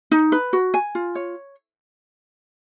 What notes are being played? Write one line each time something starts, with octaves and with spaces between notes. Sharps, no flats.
D#4
B4
F#4
G#5
F4
C#5